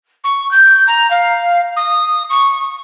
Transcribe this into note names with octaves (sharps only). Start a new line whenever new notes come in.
C#6
G6
A#5
F5
D#6
C#6